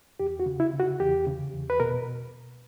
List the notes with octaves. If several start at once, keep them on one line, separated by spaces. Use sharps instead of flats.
E2 G4
F#4
C#3
E4
C#3
F#4
E2 G4
C#3
E2
B4
B2 A#4